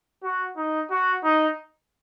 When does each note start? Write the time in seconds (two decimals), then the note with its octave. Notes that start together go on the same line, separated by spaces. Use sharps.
0.23 F#4
0.57 D#4
0.91 F#4
1.23 D#4